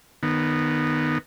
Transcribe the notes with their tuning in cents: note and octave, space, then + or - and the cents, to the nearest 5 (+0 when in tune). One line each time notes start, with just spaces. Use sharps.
D#3 -20 B3 -5